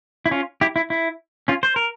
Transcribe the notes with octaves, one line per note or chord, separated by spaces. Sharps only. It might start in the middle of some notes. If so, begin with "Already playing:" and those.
E4
C#4 F4
E4 G4
E4
E4
C#4 F4
C5
A#4